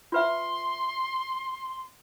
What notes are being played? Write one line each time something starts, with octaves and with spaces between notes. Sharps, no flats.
F4 B4 E5 C6